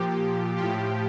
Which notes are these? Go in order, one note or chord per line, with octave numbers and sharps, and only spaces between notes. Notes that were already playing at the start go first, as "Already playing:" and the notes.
Already playing: A#2 F3 G4
A2 F3 G4